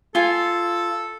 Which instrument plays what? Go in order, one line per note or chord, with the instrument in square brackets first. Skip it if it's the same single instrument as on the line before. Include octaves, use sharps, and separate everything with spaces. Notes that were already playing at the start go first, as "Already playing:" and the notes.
[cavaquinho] F4 G#5 [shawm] A4